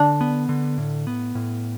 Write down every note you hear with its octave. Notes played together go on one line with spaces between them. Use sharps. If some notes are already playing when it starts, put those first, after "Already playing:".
Already playing: D3 D4
B3
D3
A2
B3
A2